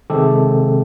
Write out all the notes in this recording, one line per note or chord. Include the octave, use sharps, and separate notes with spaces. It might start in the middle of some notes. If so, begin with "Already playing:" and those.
C3 D#3 G#3 C4 G4 A4